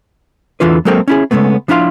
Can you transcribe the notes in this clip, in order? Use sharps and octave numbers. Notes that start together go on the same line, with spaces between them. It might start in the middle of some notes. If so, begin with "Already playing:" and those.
E2 D3 E3 F4 B4
F#3 G#3 A#3 C4 A4 G5
C#4 E4 G#4
C#3 E3 G#3 A3 B3
F3 D4 E4 G4 F5 C6